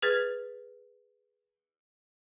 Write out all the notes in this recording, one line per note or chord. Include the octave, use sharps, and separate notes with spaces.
G#4 B4 F6 G#6 A6 B6